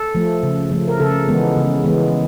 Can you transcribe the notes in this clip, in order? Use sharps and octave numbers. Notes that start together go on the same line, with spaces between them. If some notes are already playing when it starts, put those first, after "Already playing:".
Already playing: A4
F3 A3
C#3
F3 A3
A#4
C#3 A4
E3 G#3 B3
C#3
E3 G#3 B3